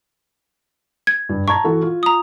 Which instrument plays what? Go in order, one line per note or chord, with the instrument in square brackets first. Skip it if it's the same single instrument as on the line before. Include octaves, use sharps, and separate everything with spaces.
[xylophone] G#6
[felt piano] G2
[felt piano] A5 A#5 G#6 [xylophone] C#6
[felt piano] E3 F#4 A4
F4
[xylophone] A#5 D#6